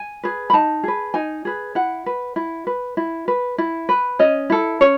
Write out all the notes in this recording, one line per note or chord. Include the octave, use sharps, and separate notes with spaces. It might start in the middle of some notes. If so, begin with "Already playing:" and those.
Already playing: G#5
G#4 B4
B5
D#4 A5
G#4 B4
D#4 G#5
G#4 B4
E4 F#5
B4
E4
B4
E4
B4
E4
B4
C#4 D#5
E4 A4
C#4 C#5